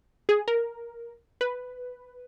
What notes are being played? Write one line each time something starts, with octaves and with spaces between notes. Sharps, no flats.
G#4
A#4
B4